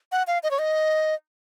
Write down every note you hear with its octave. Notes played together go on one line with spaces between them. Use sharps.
F#5
F5
D#5
C#5
D#5